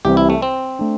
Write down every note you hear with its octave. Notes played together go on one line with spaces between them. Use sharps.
C2 C3 E3 G3 C4 G4
E4
A3
C4
A3 D4